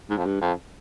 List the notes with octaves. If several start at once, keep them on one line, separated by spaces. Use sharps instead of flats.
G#2
F2
G2
F2